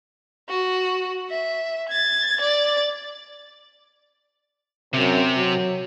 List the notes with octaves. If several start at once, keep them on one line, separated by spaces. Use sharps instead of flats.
F#4
E5
G#6 A6
D5 A6
F#2 C3
F#3